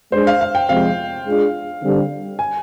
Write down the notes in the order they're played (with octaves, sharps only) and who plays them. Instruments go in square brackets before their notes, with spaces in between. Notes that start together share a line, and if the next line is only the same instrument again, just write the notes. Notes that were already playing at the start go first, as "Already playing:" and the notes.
[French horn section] G#3 D4 G#4 [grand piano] C5
[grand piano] F5
F5
G5
[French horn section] C3 F3 G#3 C4 [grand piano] F5
[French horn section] G#3 D4 F4 G#4
D3 G3 C4
[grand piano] G#5